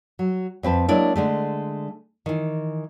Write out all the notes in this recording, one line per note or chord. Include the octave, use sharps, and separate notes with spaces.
F#3
F2 C4 B4 A5
F#3 G#3 A#3 D4 E4
D3 G#3 A3
D#3 E3